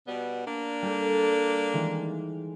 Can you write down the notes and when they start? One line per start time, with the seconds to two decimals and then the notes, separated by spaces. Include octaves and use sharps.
0.07 B2 G3 B3
0.46 A#3 D4
0.82 G3 G4 A4
1.73 D#3 E3 G#3